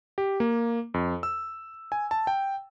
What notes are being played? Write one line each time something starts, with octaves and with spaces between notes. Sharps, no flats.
G4
A#3
F2
E6
G#5
A5
G5